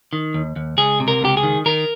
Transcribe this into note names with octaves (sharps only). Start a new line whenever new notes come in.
D#3
D#2
D#2
C#2 G#4
C3
A#4
C#2 G4
G#4
D#3
D#3 A#4